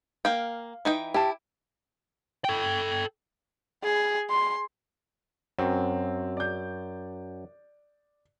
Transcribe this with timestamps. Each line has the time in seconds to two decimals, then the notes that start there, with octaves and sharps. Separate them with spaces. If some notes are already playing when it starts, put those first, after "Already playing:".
0.25 A#3 F5 G5
0.85 E3 D#4 G5
1.14 E4 G4 A5
2.45 A4 G5
3.83 G#4
4.30 C6
5.59 F#2 C4
6.37 D5 G6